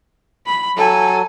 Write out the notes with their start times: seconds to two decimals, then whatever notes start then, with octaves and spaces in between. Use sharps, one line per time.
0.46 B5
0.76 F#3 A4 G#5